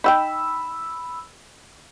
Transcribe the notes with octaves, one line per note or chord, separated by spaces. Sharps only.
D#4 F#5 G5 B5 E6